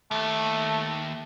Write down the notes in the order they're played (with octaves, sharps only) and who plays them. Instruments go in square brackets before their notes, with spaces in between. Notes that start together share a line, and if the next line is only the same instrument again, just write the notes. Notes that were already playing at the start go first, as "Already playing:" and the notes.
[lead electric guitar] D#2 [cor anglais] A3